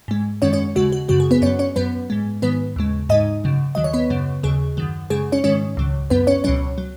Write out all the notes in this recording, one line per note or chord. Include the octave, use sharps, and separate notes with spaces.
G#2 G#3
F#2 D#3 G#3 C#4 C#5
C#4 C#5
D#2 C#3 G#3 F#4
F#4
F#2 C#3 F#3 F#4
G#4
B3 B4
F#2 F#3 C#4 C#5
C#4 C#5
F#2 F#3 B3 B4
G#2 G#3
G#2 D#3 F#3 B3 B4
D#2 C#3 G#3
G#2 G#3 D#4 D#5
F#2 C#3 F#3
D#2 D#3 F#3 D#5
C#5
B3 B4
F#2 C#3 F#3
D#2 C#3 F#3 G#4
F#2 D#3 F#3
F#2 C#3 G#3 G#4
C#4 C#5
G#2 D#3 G#3 C#4 C#5
C#2 C#3 F#3
F#2 F#3 B3 B4
C#4 C#5
C#2 B2 F#3 C#4 C#5
F#3